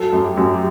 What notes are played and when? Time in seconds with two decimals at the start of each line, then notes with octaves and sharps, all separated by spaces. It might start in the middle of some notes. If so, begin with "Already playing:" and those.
Already playing: F#3 A4
0.13 F#2
0.24 G4
0.37 F#2
0.54 G4